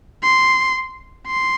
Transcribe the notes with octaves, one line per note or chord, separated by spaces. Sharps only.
C6
C6